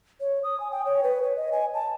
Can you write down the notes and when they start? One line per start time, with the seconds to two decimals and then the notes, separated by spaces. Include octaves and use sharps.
0.20 C#5
0.43 D#6
0.60 G#5
0.72 G5
0.86 C#5
1.03 B4
1.22 C#5
1.36 D#5
1.52 G#5
1.74 A5